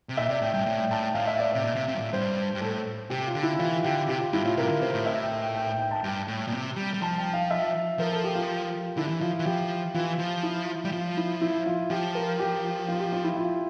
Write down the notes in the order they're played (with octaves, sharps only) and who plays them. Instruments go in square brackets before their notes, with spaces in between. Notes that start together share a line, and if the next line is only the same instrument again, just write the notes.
[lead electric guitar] C3
[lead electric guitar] A#2 [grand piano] E5
[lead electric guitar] C3 [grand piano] D5
[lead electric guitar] A2 [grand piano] G5
[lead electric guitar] G2 [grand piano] G5
[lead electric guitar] A2
[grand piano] G5
[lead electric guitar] A2 [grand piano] A5
[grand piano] G5
[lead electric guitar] A2 [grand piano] F5
[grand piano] E5
D5
[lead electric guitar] C3 [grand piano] D5
[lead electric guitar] A#2
C3
C3
G2
A2
[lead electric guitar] G2 [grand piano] C5
[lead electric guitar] G2
[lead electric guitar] A2 [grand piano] A4
[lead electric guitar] C3 [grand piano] G4
[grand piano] F4
[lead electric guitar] D3
[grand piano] E4
[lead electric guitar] E3 [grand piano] F4
[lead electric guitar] D3 [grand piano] G4
[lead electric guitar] C3 [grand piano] G4
[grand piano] F4
[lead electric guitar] G2 [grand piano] E4
[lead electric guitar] A2 [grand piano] F4
[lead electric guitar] C3 [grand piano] A#4
[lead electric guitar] D3
[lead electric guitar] C3 [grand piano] C5
[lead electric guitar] A2
[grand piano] E5
G5
G5
G5
G5
G5
A5
[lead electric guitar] G2 [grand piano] G5
[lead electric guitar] A2
A#2
C3
G3
G3
[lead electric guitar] F3 [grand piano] A5
[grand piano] G5
F5
E5
[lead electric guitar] F3 [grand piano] A#4
[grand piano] A4
G4
F4
[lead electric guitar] D3 [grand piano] E4
[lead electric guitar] E3
[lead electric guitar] F3 [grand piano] F4
[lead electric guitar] E3
[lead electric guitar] F3 [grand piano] G4
[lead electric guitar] E3 [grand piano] F4
[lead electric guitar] F3
[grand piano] E4
[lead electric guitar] G3
[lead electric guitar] F3 [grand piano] F4
[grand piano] E4
E4
F4
[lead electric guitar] F3 [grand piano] G4
[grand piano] A#4
G4
F4
G4
F4
E4
F4